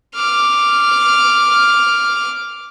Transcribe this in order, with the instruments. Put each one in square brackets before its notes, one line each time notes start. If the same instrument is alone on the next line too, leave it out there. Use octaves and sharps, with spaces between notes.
[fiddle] D6 F6